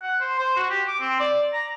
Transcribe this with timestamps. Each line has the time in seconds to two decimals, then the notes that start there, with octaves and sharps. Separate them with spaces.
0.02 F#5
0.21 C5
0.39 C5
0.56 F#4
0.70 G4
0.88 D6
1.01 C4
1.20 D5
1.53 A#5